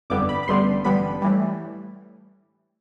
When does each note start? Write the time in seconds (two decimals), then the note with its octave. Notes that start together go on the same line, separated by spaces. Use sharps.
0.10 G1 F2 D3 G3 B3 D6
0.29 B5
0.43 B5
0.48 A1 G2 D3 G3 B3 C6
0.84 A1 G2 D3 G3 B3 B5
1.22 A2 E3 G3